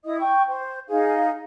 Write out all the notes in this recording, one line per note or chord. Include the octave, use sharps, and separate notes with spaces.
E4 D#5 D#6
G5 C#6
C5
D#4 G#4 F5